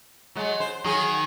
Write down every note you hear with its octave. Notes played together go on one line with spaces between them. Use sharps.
F#3 G#3
C5
D#3 F#3 G#4